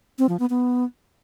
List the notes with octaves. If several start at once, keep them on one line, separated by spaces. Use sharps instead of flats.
C4
F3
B3
B3